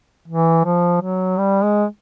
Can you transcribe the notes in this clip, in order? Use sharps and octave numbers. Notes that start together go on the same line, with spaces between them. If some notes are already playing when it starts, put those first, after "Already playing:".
E3
F3
F#3
G3
G#3